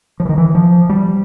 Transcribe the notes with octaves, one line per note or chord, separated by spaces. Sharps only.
F3
E3
D#3
E3
F3
G3